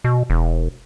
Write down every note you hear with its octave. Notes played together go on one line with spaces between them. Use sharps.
B2
E1